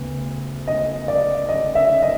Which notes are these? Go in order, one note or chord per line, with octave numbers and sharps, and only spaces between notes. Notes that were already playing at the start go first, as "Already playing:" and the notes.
Already playing: D2 C#3 B3
D#5
D5
D#5
E5
D#5